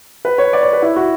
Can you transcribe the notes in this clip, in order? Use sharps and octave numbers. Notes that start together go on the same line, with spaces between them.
B4
C#5
D5
C#5
B4
E4
F#4